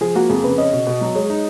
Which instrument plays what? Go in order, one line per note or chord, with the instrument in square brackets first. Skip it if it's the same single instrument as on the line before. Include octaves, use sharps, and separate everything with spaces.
[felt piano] F3 [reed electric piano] G#4
[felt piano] A#3 [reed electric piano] F#4
[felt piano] F2 [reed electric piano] G#4
[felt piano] C#3 [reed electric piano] B4
[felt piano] C#4 [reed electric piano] D#5
[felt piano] B2
B2
F#3
[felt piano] G#3 [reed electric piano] C#5
[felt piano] D#4